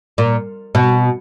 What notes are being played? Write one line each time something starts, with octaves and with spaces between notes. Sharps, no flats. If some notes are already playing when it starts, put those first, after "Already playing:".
A#2
B2